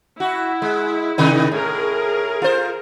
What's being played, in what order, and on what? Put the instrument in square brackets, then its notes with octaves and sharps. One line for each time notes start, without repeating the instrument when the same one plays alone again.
[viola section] E4 [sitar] F#4
[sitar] G#3
C3 D#3 D#4
[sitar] A2 [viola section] G#4 A#4
[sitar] F4 C5